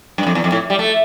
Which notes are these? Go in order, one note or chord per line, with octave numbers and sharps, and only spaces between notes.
G2
F2
E2
F2
A2
G3
A3